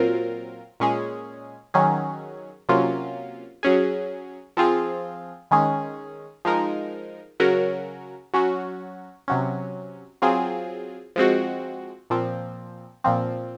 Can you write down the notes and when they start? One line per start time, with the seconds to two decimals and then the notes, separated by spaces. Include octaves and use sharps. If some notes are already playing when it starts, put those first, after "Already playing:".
Already playing: A#2 F#3 C4 F4 A#4
0.80 A#2 G#3 C#4 G#4
1.74 D#3 F#3 C#4 G#4
2.69 C3 F#3 A#3 C#4 F4
3.63 F#3 C#4 G#4
4.57 F3 C4 F4 G#4
5.51 D#3 G#3 C#4 G#4
6.45 F3 G#3 D#4 A#4
7.40 C#3 F#3 C#4 F#4 A#4
8.34 F#3 C#4 F#4
9.28 C3 F#3 C#4
10.22 F#3 C4 F4 G#4
11.16 F3 G#3 C4 F#4
12.10 A#2 F3 C4
13.04 A#2 F3 C4